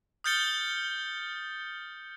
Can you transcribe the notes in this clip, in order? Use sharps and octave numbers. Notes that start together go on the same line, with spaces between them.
D#6 F6 G6 A6 C#7 G7